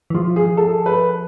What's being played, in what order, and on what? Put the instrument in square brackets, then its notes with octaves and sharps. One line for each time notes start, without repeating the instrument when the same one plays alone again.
[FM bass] E3
[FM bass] F3 [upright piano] F4
[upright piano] G#4
A4
B4